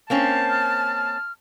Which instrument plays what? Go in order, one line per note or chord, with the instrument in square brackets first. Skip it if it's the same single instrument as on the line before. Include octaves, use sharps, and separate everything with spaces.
[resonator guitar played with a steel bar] A#3 C4 C#4 [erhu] A5
[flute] F6